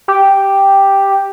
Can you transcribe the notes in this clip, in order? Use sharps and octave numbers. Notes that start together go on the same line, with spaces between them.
G4